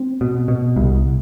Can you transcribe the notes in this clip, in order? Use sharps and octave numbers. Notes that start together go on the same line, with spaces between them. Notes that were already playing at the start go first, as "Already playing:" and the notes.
Already playing: C4
B2
B2
C2